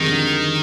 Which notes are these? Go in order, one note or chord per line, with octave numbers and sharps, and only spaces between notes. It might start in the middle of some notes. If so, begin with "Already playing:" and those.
Already playing: F2 D#3 G3 G#3
D3